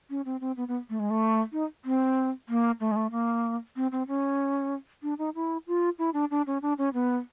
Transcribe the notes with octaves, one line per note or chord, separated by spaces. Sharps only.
C#4
C4
C4
B3
B3
A3
G#3
A3
D#4
C4
A#3
A3
G#3
A3
A#3
C4
C4
C#4
D4
D#4
E4
F4
E4
D4
D4
C#4
D4
C#4
B3